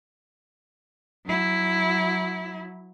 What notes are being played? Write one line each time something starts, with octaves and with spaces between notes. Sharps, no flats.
F#3 E4